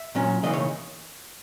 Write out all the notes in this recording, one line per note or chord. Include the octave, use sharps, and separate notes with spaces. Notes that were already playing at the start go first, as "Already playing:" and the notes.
Already playing: E5
A#2 F#3 C#4
C#3 E3 A#3 D#4 D#5
C#5